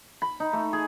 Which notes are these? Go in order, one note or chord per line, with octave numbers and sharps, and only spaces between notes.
B5
D#4
A3
G#4